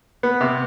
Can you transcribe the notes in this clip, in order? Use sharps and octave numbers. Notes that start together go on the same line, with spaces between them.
B3
C3